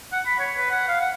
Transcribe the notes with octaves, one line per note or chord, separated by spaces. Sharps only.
F#5
B5
C#5
B4
F#5
F5
F#5